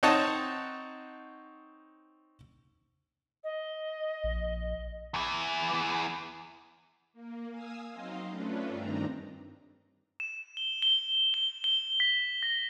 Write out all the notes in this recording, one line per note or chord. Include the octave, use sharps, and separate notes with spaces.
C4 D#4 C#5 D#5 F#5 A5
D#5
A#1
E2 E3
A#3
F5 G#5 D#6 E6
F#3 C4 D#4 C5 D#5 F5
A3 C#4 D4 F4 B4
G2 D#3 C4 D4 A#5
E7
G7
G7
G7
G7
B6
A#6